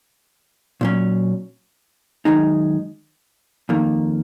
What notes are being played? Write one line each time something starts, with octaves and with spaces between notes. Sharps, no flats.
A#2 F#3 C#4
F#2 D#3 G#3 D#4
F2 D#3 A#3